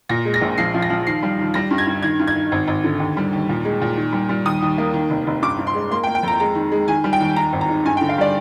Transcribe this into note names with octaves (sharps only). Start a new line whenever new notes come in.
A#2 A#6
G#3
A#6
A#1
F3 C7
F3
A#6
F3
D#3 C7
G3
D#2
G3 A#6
G2
G#6
G2
D#3 G#6
G2
G#6
D#3
G#1
G#1
D3
D#2
G3
D#2
A#2
G#3
A#2
D#3
G3
G3
D#2 D#6
D#2
A#3
D#3
F1
F1
G2 D6
G2
C6
G#3
A#3 C6
G5
A#3
G5
F2 A#5
G#3 A#5
D#3
G#3
D#3 G#5
G3
G5
D#2
D#3 A#5
G#1
A#5
G#2
G2 G#5
G5
D3
F5
G3 D5